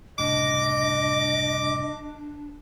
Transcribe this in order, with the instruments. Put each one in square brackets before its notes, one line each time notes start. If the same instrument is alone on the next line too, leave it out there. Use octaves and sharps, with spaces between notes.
[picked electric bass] F#1 C2 A2 [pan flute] D4 [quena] D#5 [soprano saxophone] D6